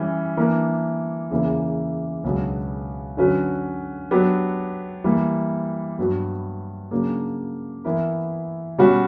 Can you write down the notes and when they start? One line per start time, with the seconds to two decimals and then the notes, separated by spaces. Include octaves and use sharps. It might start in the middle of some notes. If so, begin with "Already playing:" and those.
Already playing: E3 G3 C#4
0.37 E3 A#3 D4 A#4
1.31 E2 C#3 E3 A#3 E4
2.24 C#2 B2 F#3 B3 D4
3.17 D3 F#3 C#4 F#4 B4
4.11 F#3 B3 D4 G4
5.04 E3 G3 A#3
5.99 G2 F#3 B3 F#4
6.91 C#3 F#3 A#3 D4
7.84 E3 B3 E4 A#4
8.78 B2 G3 C#4 F#4